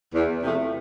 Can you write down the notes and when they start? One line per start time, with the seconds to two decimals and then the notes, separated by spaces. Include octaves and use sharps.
0.14 E2
0.43 C3 F3 A3